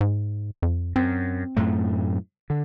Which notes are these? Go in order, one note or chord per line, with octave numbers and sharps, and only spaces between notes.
G#2
F2
F#2 C4
F#2 A2 A3
D3